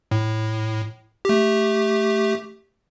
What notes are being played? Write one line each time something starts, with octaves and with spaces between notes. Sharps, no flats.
A2
A3 G4